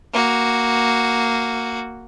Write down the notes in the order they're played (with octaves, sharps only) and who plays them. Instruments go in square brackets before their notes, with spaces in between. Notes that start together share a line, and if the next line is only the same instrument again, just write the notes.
[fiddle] A#3 F#4